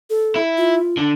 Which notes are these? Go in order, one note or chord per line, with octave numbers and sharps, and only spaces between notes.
A4
E4
F4
D3